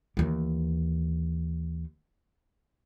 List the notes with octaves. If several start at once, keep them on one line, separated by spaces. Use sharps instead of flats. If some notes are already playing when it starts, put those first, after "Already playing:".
D#2 E3